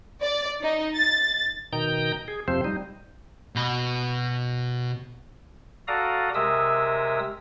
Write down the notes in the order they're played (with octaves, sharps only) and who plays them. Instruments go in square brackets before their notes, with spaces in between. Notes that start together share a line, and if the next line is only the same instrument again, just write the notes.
[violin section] D5
D#4
A6
[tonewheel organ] B2 D#3 D#4 G5 A#5 G6
G#4
F2 C3 F3 C4 C5
G3 D#4
[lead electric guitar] B2 B5
[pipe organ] F#4 A4 D5 F5 A#5 D#6
C3 G#3 A#4 E5 D#6 E6